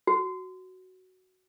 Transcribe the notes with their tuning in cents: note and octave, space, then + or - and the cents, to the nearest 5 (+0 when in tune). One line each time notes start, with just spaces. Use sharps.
F#4 +5